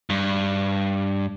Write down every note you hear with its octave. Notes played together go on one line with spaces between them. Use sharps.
G2